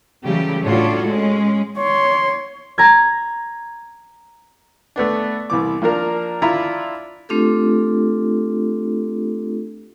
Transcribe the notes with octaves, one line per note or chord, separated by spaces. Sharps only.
C#3 E3 F#3 G3 A3 G4
A2 D4 F4 F#4 A4 C#5
G#3 C#4
C#5 C6
A#5 G#6
A3 B3 D4
C2 E3 D6
F3 A#3 D4 A#4
D4 E4 F4 E5 A#5 B5
A3 C4 D4 F4 G4 A4